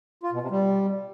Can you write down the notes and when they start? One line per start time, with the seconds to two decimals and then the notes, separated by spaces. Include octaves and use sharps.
0.23 F4
0.32 B2
0.42 C3
0.51 G3